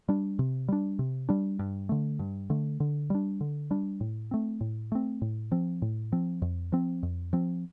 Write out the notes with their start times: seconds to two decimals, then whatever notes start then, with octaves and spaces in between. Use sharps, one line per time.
0.09 G3 D4
0.39 C3
0.68 G3 D4
0.99 C3
1.29 G3 D4
1.59 G2
1.89 D3 A3
2.19 G2
2.50 D3 A3
2.80 D3
3.10 G3 D4
3.41 D3
3.71 G3 D4
4.01 A2
4.31 A3 C4
4.61 A2
4.92 A3 C4
5.22 A2
5.52 F3 C4
5.82 A2
6.12 F3 C4
6.42 F2
6.72 F3 C4
7.03 F2
7.33 F3 C4